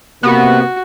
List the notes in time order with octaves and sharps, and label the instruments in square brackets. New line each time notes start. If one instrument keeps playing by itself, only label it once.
[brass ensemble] C3 A#3 [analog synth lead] B3 [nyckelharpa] F#4